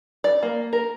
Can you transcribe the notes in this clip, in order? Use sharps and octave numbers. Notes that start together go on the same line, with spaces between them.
D5
A#3
A#4